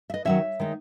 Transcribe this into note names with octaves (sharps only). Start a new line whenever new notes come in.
E5
B4 D#5
D#3 F#3 C#4 C#5 E5
D#3 G#3 D#4